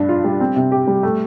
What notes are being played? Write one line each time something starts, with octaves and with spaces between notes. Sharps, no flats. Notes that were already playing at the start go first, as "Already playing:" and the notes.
Already playing: G2 D4
F4
G3
C4
C3
G4
G3
A3